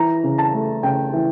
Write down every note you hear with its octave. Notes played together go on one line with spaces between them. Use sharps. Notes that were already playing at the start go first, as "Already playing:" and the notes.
Already playing: E3 A#5
C#3
A5
A3
C#3 G5
E3